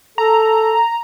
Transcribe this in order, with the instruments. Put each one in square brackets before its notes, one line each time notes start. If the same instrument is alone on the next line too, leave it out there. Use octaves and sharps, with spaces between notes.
[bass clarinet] A4 [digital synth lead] A#5